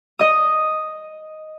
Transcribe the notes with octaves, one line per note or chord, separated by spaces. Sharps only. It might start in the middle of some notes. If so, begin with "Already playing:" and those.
D#5 D#6